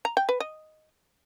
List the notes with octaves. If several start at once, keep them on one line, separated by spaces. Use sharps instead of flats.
A#5
G5
B4
D#5